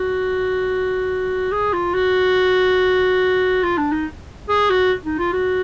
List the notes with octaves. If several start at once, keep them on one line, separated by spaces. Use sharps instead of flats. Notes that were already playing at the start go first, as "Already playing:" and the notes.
Already playing: F#4
G#4
F4
F#4
F4
D4
D#4
G#4
F#4
D#4
F4
F#4